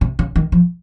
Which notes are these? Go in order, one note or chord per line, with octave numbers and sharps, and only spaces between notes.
C3
C#3
D#3
F3